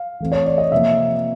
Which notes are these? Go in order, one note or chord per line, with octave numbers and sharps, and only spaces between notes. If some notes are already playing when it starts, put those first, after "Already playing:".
Already playing: F5
E3 A3 C4
C#5
D5
D#5
C3 F3 A#3 E5